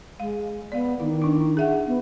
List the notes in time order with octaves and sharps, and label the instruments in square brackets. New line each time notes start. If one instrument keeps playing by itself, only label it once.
[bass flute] G#3 [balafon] F5
[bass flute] B3 [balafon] D5 F5
[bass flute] D#3 [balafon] E4
[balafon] D4 E4
G#4 E5 F#5
[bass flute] B3